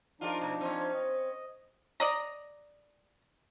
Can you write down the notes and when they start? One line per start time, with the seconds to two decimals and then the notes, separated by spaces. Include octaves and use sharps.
0.21 F3 D4 D#4 F4 F#4 A#4
0.41 B2
0.61 C4 C#4
0.94 D#5
2.00 D5 D#5 A#5